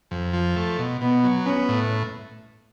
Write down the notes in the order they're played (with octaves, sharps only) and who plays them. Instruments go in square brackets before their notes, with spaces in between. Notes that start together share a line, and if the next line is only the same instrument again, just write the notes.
[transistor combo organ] F2
F3
A3
B2
[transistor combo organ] B2 [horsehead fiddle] B3
[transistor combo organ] F#3
[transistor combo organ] B3 [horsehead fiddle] C#4
[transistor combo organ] A2